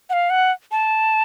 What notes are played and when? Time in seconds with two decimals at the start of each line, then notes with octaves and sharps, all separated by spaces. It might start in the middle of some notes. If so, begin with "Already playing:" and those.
0.10 F#5
0.13 F5
0.30 F#5
0.72 A5